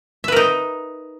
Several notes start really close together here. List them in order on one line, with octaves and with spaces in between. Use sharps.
E5 B4 A#4 D#4